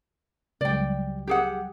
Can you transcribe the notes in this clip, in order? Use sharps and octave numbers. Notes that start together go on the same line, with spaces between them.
C#2 F#3 G3 D5 G5
G4 G#4 F#5